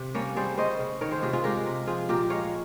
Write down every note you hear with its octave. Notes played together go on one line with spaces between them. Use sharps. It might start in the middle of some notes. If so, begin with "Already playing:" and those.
Already playing: C3
G3 A#3 C#4
G3 G#4 C5
C#3 C5 D#5
C#3
D#3 A#4 C#5
G#4 C5
C3 F4 G#4
F4 G#4
G#3 G4 A#4
C3
F3 F4 G#4
A#2 G4 A#4
G#3 C#5 F5